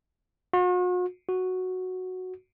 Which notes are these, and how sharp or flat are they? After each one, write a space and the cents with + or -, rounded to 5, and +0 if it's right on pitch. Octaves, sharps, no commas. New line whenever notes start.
F#4 -45
F#4 -5